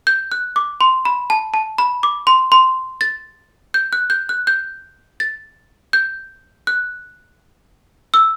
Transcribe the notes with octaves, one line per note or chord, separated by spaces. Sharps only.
G6
F#6
D6
C6
B5
A5
A5
B5
D6
C6
C6
A6
G6
F#6
G6
F#6
G6
A6
G6
F#6
E6